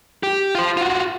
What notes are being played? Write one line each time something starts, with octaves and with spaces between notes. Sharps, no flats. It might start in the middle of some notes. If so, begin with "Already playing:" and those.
G4
F4 C5
F4 F#4